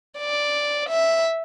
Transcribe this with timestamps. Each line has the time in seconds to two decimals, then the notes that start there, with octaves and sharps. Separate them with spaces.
0.19 D5
0.90 E5